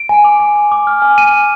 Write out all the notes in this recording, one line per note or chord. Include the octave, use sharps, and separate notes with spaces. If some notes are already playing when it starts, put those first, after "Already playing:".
Already playing: D7
G#5
D6
G#5
G#5
D6
F6
G#5
G#5 D#7
G#5